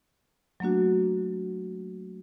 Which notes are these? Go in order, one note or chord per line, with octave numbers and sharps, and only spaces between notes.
F#3 A3 A#3 D4 F#4